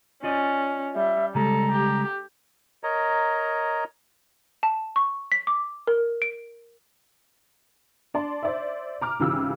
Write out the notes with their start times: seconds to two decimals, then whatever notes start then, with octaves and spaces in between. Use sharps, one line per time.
0.24 C#4 F4 D5 D#5
0.95 G3 E5
1.35 C#3 G3 G#3 A4 A#5
1.72 G4
2.84 A#4 C#5 D#5 A#5
4.63 A5
4.96 C#6
5.32 B6
5.47 D6
5.87 A#4
6.22 D7
8.14 D4 D5 A5 C6
8.43 C5 D5 E5
9.01 A#5 D6 F6
9.20 G#1 C#3 E3 F4 G4 E6